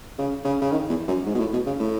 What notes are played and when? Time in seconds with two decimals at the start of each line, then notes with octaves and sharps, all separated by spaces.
0.19 C#3
0.44 C#3
0.62 C#3
0.72 D#3
0.89 E2
1.08 F#2
1.26 G#2
1.34 B2
1.39 A2
1.53 B2
1.66 C#3
1.80 A2